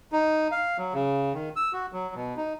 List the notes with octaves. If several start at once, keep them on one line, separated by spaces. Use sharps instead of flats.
D#4
F5
F#3
C#3
D#3
E6
F#4
F#3
B2
D#4